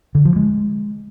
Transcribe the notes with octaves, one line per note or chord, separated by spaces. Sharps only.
D3
F3
G#3